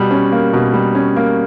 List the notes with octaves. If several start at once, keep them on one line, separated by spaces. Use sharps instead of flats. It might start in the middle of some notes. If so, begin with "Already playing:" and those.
Already playing: B2 G3
C#4
A#3
B2
G3
C#4
A#3